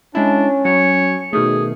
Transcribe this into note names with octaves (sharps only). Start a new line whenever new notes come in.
G#3 C#4 D4 E4
F#3 C#5
B2 D#3 A3 G#4